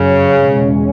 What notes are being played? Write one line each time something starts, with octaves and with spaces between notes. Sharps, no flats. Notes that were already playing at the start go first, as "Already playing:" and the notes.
Already playing: F#2 C#3 F#3 C#4
E2 B2 G#3 C#4